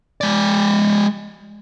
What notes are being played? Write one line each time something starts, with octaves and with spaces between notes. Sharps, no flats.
G#3 D5